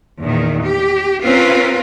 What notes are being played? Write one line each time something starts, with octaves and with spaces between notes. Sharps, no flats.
E2 A#2 D#3
G4
C4 C#4 F4 A#4 B4